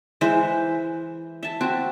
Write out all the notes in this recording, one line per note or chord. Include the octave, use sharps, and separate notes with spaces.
E3 G#3 C5 E5
E5 A5
C4 F#4